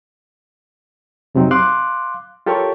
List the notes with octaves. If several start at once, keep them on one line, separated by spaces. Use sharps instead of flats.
F2 C3 F#3 C4 D#4
F5 C6 D6 F#6
F4 G4 A4 A#4 C#5 C#6